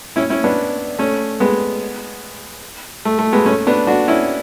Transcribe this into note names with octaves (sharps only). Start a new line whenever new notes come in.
C#4 E4
C#4 E4
B3 D4
A3 C#4
G#3 B3
A3
A3
G#3 B3
A3 C#4
B3 D4
D4 F#4
C#4 E4